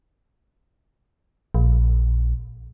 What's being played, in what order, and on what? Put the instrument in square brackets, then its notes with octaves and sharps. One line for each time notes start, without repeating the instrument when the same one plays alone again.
[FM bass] A#1